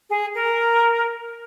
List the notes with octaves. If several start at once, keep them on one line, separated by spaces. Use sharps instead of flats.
G#4
A#4